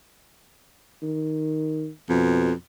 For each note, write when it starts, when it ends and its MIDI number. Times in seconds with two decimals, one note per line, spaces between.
1.03 1.89 51
2.10 2.53 41
2.10 2.51 47